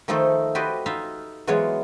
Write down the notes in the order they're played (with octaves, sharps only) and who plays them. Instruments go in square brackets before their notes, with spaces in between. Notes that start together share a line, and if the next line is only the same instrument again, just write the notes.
[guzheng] D#3 F3 A3 D#4 A4 C5
F#4 G4 B4 C5 D5 D#5
D#4 F4 E5 F5
E3 F#3 G#3 B3 F4 C#5